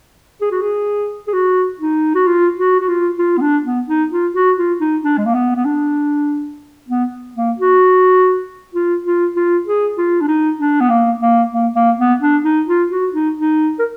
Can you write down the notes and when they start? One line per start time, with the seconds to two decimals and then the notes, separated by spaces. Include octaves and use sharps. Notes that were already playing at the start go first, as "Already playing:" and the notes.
0.41 G#4
0.51 F#4
0.61 G#4
1.28 G#4
1.33 F#4
1.79 D#4
2.15 F#4
2.26 F4
2.57 F#4
2.80 F#4
2.88 F4
3.19 F4
3.38 B3
3.42 D4
3.65 B3
3.88 D#4
4.11 F4
4.35 F#4
4.57 F4
4.80 D#4
5.04 D4
5.17 G#3
5.26 A#3
5.34 B3
5.56 B3
5.65 D4
6.89 B3
7.35 A#3
7.58 F#4
8.74 F4
9.05 F4
9.36 F4
9.66 G#4
9.97 F4
10.21 D4
10.28 D#4
10.59 D4
10.81 B3
10.90 A#3
11.21 A#3
11.52 A#3
11.75 A#3
11.98 B3
12.21 D4
12.44 D#4
12.68 F4
12.91 F#4
13.13 D#4
13.37 D#4
13.79 A#4